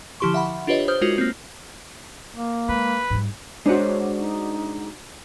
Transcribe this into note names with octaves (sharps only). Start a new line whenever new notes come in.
D3 F3 E4 G4 C6 C#6
E5 F#5 B5
D4 F4 G4 B4 C#5 D#5
C5 D#6 F6 G6
G#3 D#4 F4 F#4 A#4
A#3 C4
A#3
G#3 B4
G#2 G3
G#3 D4 F#4 C5 C#5 F#5
D#4